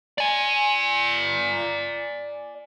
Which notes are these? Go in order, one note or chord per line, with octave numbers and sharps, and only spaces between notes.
D5 G#5